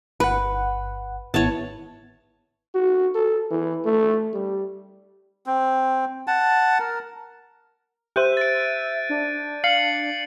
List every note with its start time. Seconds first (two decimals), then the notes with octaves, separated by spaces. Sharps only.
0.20 G1 B4 F#5
1.34 G#1 B3 E4 C#5 A5
2.75 F#4
3.15 A4
3.50 E3
3.85 A3
4.33 G3
5.46 C4
6.27 F#5 A5
6.79 A#4
8.16 G4 C5 E5 F#6 G6 D#7
8.37 A6 D7
9.10 D4
9.64 F5 C7 C#7 F#7